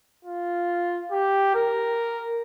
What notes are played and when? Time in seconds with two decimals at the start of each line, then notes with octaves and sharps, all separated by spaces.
0.25 F4
1.11 G4
1.55 A#4